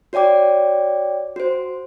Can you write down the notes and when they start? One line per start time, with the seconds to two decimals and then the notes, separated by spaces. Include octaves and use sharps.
0.13 F#4 C#5 D5 G5 D6
1.36 F#4 C5